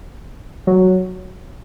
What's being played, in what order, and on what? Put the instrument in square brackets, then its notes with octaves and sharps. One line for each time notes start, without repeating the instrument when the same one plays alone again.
[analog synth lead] F#3